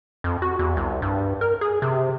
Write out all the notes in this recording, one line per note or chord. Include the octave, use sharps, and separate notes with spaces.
F2
F#4
E2
C2
G2
A#4
G#4
C3